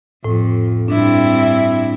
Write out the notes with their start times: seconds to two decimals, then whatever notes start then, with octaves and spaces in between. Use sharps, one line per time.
0.24 F2 A2
0.88 G2 C4 D4 E4